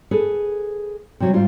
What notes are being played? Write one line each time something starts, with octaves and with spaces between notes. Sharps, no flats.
G#4 A4 B4
C3 F#3 G3
G#2 G3 F4